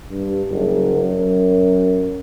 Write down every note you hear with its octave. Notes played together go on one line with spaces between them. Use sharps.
G2
F#1
F#2